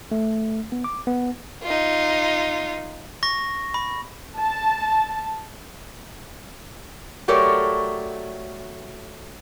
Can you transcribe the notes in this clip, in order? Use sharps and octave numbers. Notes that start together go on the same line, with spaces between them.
A3
B3
D6
B3
D#4 F4
C#6 A#6
B5
A5
F#3 A3 G4 A#4 C#5 D5